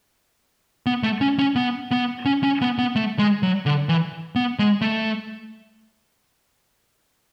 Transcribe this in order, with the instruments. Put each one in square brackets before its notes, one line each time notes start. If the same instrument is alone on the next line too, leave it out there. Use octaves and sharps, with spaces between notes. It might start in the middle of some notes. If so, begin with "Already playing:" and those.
[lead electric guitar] B3
A3
C#4
C#4
B3
B3
C#4
C#4
B3
B3
A3
G#3
F#3
D3
E3
B3
G#3
A3